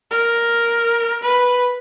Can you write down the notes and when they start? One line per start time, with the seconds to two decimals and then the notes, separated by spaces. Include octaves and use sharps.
0.11 A#4
1.23 B4